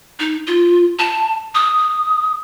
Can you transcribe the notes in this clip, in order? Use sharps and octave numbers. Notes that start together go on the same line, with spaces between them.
D#4
F4
A5
D#6